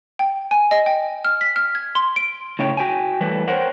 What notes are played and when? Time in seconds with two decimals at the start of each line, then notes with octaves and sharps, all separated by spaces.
0.19 G5
0.51 G#5
0.71 D#5
0.86 G5
1.25 F6
1.41 B6
1.56 F6
1.75 G#6
1.95 C6
2.16 D7
2.59 A2 C#3 C#5 G5
2.77 F#4 G5 G#5
3.20 E3 G3 A3 B4
3.47 A#4 C5 C#5 F#5 G5